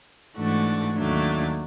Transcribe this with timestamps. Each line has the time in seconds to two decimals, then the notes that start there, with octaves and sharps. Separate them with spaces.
0.36 G#2 E3 A3 D4 F#4
0.95 D#2 D#3 F#3 A3 D4